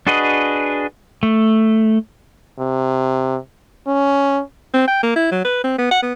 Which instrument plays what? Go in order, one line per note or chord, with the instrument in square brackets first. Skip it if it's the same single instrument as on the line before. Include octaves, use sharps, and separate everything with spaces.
[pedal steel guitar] D4 F#4 G#4 B4 D#5
A3
[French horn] C3
C#4
[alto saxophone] C4
G5
A#3
E4
F#3
B4
C4
B3
F#5
B3